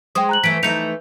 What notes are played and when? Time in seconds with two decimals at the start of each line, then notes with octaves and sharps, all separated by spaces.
0.15 G#3 C5 G5 D#6
0.29 A#5 F#6 F#7
0.44 E3 A3 B6 D7
0.63 E3 A3 D#4 G6 C#7 F7